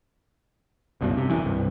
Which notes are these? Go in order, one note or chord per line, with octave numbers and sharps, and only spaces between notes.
F#1 C2 G2 B2
C3
C3 E3
C2 G2